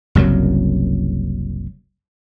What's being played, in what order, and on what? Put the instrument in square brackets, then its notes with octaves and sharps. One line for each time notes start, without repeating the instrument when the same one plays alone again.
[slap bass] F#1 C2 F#2 F#3